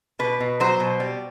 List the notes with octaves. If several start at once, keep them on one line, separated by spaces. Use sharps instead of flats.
B2 B4
B2
F#3 C5
B2
G3